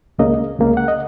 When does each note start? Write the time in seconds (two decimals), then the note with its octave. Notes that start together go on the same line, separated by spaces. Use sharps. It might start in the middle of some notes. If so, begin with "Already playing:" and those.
0.19 C#2 C#3 A#3 D#5
0.59 C#2 C#3 A#3
0.77 F#5
0.88 D#5